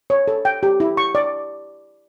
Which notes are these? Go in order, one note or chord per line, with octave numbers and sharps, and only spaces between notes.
C#5
A4
G5
G4
E4
C#6
D5